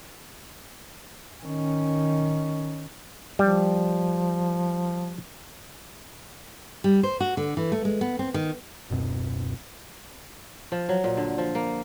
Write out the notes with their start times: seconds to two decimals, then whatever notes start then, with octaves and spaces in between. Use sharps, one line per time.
1.42 D#3 C#4
3.39 F3 G3
6.84 G3
7.03 C5
7.20 F#4
7.37 D3
7.57 E3
7.72 A3
7.85 G#3
8.01 B3
8.19 C4
8.34 D#3
8.90 D1 F#2 B2 C4
10.72 F3
10.89 F#3
11.04 A#2
11.17 D3
11.38 F3
11.55 A#3